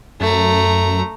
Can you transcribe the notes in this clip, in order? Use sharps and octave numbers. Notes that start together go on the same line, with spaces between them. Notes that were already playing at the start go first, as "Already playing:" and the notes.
F#2 A3 A#5